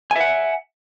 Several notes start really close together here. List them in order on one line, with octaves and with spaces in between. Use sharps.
G#5 E5 F#5